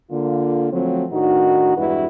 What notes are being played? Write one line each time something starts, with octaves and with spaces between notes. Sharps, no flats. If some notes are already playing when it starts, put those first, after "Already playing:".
D3 A#3 F4
F3 F#3 A3 C4
A2 D#3 D4 D#4 F#4
E2 G2 G#3 E4 F#4 B4